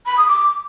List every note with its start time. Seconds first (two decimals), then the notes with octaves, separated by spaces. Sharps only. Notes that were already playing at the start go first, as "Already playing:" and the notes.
0.06 B5
0.17 D#6
0.28 D6